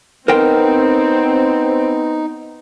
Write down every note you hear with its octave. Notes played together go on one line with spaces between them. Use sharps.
B3 C4 D#4 A#4 C5 G5